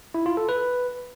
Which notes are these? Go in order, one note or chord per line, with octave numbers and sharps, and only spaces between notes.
E4
F4
A4
B4